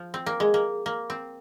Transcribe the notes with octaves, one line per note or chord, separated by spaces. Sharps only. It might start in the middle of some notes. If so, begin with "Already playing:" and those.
Already playing: F3
C4
A#3
G#3
A#3
A#3
C4